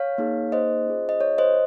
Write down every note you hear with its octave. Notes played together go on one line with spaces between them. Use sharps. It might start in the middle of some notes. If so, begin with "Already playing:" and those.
Already playing: C#5 F5
A#3 D#4 G#4
C5 D#5
C#4 F4 G#4
D#5
C#5
C5 D#5